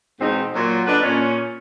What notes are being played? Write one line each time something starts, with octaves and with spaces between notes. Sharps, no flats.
E2 G#2 B2 C4 D#4
A#2 F#3
D3 D4 B4 D5 D#5
A#2 C#4